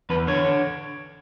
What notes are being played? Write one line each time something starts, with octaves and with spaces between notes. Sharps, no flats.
E2 B4
D3 C#5
D3